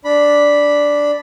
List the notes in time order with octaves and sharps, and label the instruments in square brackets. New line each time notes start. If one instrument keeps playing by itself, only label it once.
[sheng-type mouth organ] D4 B5